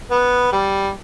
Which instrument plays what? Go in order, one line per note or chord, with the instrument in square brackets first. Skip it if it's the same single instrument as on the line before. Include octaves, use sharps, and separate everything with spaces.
[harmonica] B3
G3